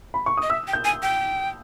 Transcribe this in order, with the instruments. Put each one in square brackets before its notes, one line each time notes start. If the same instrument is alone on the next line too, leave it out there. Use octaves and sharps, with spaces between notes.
[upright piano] B5
C#6
[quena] D#5 [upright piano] D#6
[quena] E5 [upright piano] E6
[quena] G5
[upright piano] G6
[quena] G#5
G5